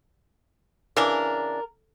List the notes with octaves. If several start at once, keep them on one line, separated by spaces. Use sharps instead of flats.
C#3 E3 D4 A#4